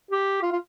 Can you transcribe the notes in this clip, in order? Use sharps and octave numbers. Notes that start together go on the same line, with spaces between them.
G4
F4
F4